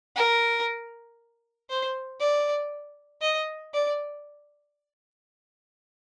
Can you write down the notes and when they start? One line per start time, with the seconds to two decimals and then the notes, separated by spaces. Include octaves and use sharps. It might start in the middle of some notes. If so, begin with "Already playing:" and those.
0.16 A#4
1.69 C5
2.20 D5
3.22 D#5
3.74 D5